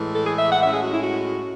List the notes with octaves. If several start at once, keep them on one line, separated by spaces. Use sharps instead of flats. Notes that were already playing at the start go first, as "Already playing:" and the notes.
Already playing: A2 E3 G#3
A4
G#4
E5
F#5
A2 G#3 C#4 E5
G#4
F#4
E4
F#4